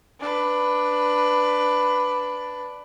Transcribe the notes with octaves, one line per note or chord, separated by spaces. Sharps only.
D4 B4